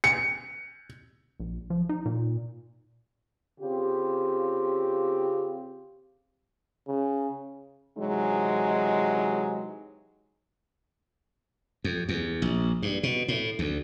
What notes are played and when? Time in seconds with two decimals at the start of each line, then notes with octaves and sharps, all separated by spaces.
0.04 C#7
1.40 A#1
1.70 F3
1.89 D#4
2.06 A#2
3.60 C#3 C4 F4 G4
6.87 C#3
7.97 C3 E3 F#3 G#3 D#4
11.84 F2
12.09 E2
12.42 A#1
12.82 G2
13.03 B2
13.28 A2
13.59 D2